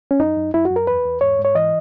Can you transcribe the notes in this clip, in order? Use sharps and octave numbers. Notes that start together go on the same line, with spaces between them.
C#4
F#2 D#4
F#2
F#2 E4
F#2 F#4
A#4
E2 B4
E2
G#2 C#5
G#2
C#5
E3 D#5